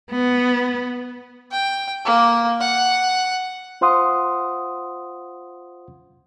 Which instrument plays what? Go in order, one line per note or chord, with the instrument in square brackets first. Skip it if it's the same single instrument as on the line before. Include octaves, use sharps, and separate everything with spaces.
[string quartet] B3
[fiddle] G5
A#3
F#5
[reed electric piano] F4 C5 F5 F#5 C6 D#6